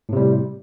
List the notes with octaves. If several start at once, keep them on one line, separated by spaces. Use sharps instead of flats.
A2 C3 G3